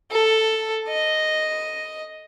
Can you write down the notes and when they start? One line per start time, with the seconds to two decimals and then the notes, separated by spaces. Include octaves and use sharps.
0.11 A4
0.89 D#5